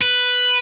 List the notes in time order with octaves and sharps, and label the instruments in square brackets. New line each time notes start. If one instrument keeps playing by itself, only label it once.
[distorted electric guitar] B4